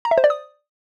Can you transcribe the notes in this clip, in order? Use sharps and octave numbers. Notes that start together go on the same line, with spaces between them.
A#5
E5
C5
D5
D#6